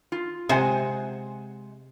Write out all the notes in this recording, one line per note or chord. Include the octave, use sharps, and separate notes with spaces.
F4
C3 G#3 C5 F#5 G#5